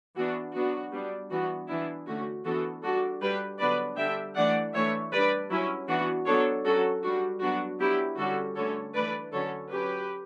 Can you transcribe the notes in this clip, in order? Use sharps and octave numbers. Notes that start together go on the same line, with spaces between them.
E3 B3 D4 F#4
F#3 B3 D4 F#4
G3 B3 D4
E3 B3 D4 F#4
E3 B3 D4 E4
D3 A3 C#4 F#4
E3 B3 D4 F#4 A4
G3 D4 F#4 A4
G3 D4 G4 B4
D3 F#3 B3 D4 B4 D5
D3 G3 D4 E5 G5
E3 A3 D4 D5 F#5
E3 A3 D4 C#5 E5
G3 D4 B4 D5
F#3 C#4 E4
E3 B3 D4 F#4
F#3 B3 D4 A4 C#5
F#3 C#4 F#4 A4
G3 D4 F#4
F#3 B3 D4 F#4
F#3 B3 D4 E4 G4
D3 G3 C#4 F#4 A4
D3 A3 C#4 A4 C#5
E3 A3 D4 B4 D5
D3 F#3 C#4 A4 C#5
F#3 C#4 G4 B4